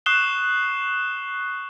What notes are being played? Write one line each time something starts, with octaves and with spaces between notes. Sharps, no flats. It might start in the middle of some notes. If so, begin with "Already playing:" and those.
C#6 D#6 F#6 C7 E7 G7